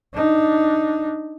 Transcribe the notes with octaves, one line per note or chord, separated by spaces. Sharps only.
D4 D#4